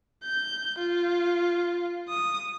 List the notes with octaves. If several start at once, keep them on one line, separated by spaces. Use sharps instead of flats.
G6
F4
D#6